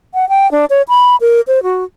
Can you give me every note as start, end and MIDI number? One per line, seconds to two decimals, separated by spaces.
0.14 0.28 78
0.29 0.50 79
0.52 0.65 62
0.70 0.82 73
0.89 1.16 83
1.21 1.41 70
1.48 1.62 72
1.63 1.84 66